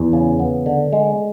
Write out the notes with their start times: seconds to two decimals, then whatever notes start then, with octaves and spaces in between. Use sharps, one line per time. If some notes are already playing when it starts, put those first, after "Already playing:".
Already playing: E2
0.13 C#3
0.39 B3
0.66 D3
0.93 G#3